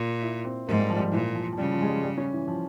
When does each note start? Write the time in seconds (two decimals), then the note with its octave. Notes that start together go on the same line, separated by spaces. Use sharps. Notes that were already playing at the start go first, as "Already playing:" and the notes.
Already playing: A#2
0.22 E4
0.45 C4
0.67 G#2 A#3
0.79 G3
0.90 F3
0.96 G3
1.01 F3
1.12 A#2 E3
1.35 F3
1.53 F3
1.58 C#3 G3
1.72 F3
1.81 G#3
1.88 G3
2.03 G3
2.18 C#4
2.33 E3
2.48 F3